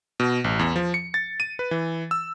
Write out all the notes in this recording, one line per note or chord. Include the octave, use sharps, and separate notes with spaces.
B2
A1
E2
F3
C#7
A6
D#7
B4
E3
E6